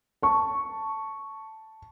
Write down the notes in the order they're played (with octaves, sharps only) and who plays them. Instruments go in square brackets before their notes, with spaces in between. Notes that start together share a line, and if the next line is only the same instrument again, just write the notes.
[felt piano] A5 C#6